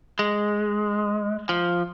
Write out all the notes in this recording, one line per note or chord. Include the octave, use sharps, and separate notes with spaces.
G#3
F3